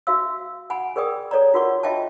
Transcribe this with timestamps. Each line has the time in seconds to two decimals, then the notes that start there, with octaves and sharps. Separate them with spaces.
0.07 F#4 E5 F5 E6
0.70 F#5 G#5 B5
0.96 G#4 A#4 D5 G5 D#6
1.31 A4 C#5 D5 A#5
1.54 F4 F#4 A#4 F#5 C#6
1.83 F4 D#5 E5 G5 A5